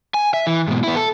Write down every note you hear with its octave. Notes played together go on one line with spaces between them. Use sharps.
G#5
E5
E3
G#2 B2
B3 E4
A4